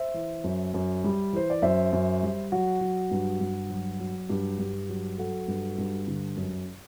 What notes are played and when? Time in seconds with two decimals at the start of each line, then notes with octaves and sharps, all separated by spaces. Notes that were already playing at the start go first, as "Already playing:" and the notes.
Already playing: C5 E5
0.14 E3
0.44 F#2
0.74 F#2
1.04 G3
1.33 E3 C5
1.50 D5
1.62 F#2 C5 E5
1.93 F#2
2.23 G3
2.52 F#3 F#4
2.81 F#3
3.11 G2
3.41 G2
3.70 F#3
4.00 F#3
4.29 G2 G4
4.59 G2
4.89 F#3
5.18 F#3 F#4 A4
5.48 G2
5.78 G2
6.08 D3
6.37 F#2